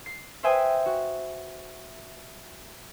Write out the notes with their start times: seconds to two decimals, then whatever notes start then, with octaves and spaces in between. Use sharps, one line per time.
0.06 C7
0.43 B4 C5 E5 G5 G#5 D#6
0.86 F#4